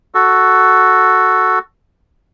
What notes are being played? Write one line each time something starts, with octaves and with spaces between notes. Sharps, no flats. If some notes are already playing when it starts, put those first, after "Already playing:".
F#4 A4